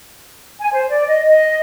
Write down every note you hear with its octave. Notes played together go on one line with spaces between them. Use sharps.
G#5
C5
D5
D#5
D#5